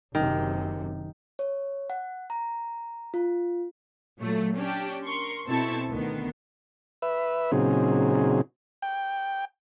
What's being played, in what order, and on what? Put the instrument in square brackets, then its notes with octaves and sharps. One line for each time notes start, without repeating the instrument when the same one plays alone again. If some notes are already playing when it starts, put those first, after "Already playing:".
[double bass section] F#1 F#2 C3 [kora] D#3
[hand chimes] C#5
F#5
A#5
F4
[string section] A#2 F#3 A3
C#4 D4 G4
A#4 C6 C#6
B2 C4 E4 A4 A5 C#6
D2 D#3 B3
[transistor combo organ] B4 E5
A#2 C#3 F#3 C4 D#4 G#4
G5